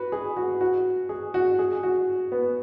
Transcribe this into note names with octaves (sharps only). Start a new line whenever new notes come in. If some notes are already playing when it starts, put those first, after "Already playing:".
Already playing: F#4 B4
G#4
F#4
F#4
G#4
F#4
G#4
F#4
B3